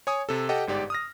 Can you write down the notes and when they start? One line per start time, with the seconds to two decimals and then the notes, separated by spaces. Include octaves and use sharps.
0.07 C#5 G#5 D#6
0.29 C3 A4
0.49 G4 A4 D#5 F#5 G5
0.67 G1 G#2 G4 D5
0.90 D#6 F6 A#6